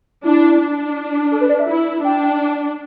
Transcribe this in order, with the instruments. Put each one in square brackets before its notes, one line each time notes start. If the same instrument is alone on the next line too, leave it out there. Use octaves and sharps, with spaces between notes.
[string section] D4 [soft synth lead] E4
[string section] D4
[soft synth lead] A4
B4
D5
E5
[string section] E4
[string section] D4 [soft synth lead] G5